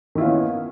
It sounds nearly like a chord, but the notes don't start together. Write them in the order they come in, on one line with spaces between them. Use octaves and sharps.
D#3 E4 F4 C#4 B3